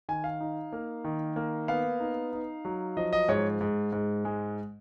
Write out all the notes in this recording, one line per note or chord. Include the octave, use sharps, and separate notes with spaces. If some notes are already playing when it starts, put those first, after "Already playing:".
D#3 G#5
F5
D#4
A#3
D#3
A#3
B3 F5
D#4
D#4
F#3
F3 D#5
D#5
G#2 C#5
G#2
G#2
G#3